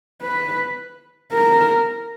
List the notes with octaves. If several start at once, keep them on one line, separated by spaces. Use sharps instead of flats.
B4
A#4